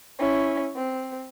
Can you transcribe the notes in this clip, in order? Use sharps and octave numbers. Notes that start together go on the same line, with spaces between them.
C#4 E4
C4